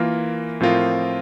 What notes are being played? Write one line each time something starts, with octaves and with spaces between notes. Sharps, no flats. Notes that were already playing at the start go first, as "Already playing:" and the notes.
Already playing: E3 A#3 F4 A#4
A2 F3 C4 F4 A#4